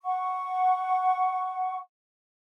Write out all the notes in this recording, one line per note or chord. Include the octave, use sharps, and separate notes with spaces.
F#5 C#6